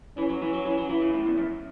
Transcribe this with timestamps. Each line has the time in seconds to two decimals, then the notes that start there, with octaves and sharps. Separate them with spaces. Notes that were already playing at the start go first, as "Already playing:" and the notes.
0.17 E3 C#4
0.29 F#3
0.42 E3
0.53 F#3
0.66 E3
0.78 F#3
0.90 E3 E4
1.01 C#3
1.14 A2
1.26 E2
1.38 F#2